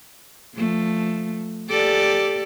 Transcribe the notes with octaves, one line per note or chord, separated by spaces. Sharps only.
F3 A3
G4 A4 D5